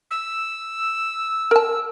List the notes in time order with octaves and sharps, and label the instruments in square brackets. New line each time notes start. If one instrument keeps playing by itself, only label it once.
[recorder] E6
[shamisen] A#4 A5